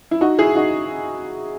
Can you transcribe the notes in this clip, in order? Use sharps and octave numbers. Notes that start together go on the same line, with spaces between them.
E4
D#4 F#4
E4 G#4
D#4 F#4